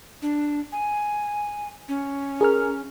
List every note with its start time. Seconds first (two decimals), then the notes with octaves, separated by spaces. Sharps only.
0.22 D4
0.72 G#5
1.88 C#4
2.41 G#4 A#4 F6